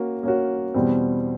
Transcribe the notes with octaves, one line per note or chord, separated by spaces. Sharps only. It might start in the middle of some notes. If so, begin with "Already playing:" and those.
Already playing: A#3 C#4 F#4
A#3 C#4 F#4
E2 B2 G3 C4